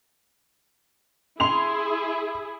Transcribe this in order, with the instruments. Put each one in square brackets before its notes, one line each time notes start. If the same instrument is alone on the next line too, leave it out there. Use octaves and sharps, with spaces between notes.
[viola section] E4 G#4 [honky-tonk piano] C6 F7